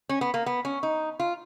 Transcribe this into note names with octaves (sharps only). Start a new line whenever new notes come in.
C#4
B3
A#3
B3
C#4
D#4
F4